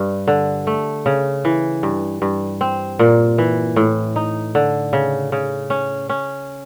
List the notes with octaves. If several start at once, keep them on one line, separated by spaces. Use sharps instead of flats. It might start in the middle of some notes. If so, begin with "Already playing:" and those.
Already playing: G2
D3
A3
C#3
E3
G2
G2
C4
A#2
E3
A2
D#4
D3
C#3
C#3
C#4
C#4